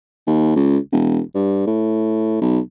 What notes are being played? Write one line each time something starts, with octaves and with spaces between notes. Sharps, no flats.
D#2
C#2
E1
G2
A2
B1